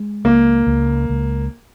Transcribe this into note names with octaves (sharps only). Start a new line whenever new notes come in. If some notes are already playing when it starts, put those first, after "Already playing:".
Already playing: G#3
C#2 A#3
C#2
C#2